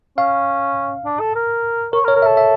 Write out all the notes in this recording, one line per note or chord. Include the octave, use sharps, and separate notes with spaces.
C#4 F5
D4
A4
A#4
A#4 C#5
A#4
C#5
A#4
E5
A4
E5